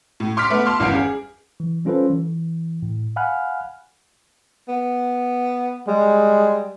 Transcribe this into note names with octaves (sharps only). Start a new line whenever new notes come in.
A2
C6 D6 F6 B6
A3 B3 B4
A5 C6 F6
G#1 E2 G2 C#4 F5 D7
G#4
E3
G3 C#4 F4 A4 B4 C5
E3
A2
F5 F#5 G#5 B5 F6 F#6
B3
G3 G#3